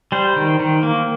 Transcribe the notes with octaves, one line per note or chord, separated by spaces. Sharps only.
G3 C5
D#3
D#3
A#3